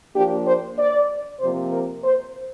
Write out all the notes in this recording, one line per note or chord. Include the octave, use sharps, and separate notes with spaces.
F3 A#3 D4 G4
C5
D5
C3 F3 A#3 C5
A#4
C5